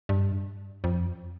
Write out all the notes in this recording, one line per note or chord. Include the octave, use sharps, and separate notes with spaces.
G2
F2